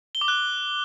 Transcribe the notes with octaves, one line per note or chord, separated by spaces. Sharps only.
G7
D6
F#6